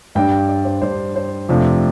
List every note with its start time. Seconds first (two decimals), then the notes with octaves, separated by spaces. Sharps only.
0.15 G2 G3 D4 G5
0.32 G5
0.49 D5
0.65 C5
0.82 G2 G3 D4 C5
1.16 C5
1.49 F2 C3 F3 A3 D4